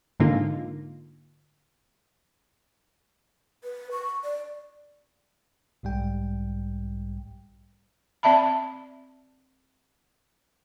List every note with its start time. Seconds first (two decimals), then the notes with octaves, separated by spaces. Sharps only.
0.20 G#2 D3 A#3 D#4 F4
3.64 B4
3.92 C#6
4.24 D5
5.83 B1 G#2 G3 G5
8.23 C4 D5 E5 A5 B5